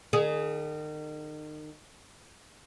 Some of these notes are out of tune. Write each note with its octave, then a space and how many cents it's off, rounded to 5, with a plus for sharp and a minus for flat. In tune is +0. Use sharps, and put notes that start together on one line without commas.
D#3 -35 G#4 +0